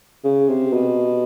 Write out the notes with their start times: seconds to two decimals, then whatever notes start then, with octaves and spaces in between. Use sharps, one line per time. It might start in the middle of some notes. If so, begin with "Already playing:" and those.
0.24 C#3
0.48 C3
0.73 B2